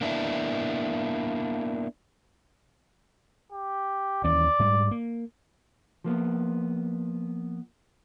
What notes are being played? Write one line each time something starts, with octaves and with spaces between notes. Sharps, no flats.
A#3 B3 D4 E4
G4
D#2 E3 C#4 D5
G#2 G3
A#3
F3 A#3 B3